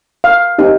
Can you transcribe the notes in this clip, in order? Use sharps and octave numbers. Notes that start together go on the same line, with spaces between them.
F5
C4 D#4 G4